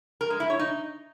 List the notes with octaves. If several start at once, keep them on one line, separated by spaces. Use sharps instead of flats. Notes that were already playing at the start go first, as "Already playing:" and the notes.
A#4
G#3
E4
C#5
D#4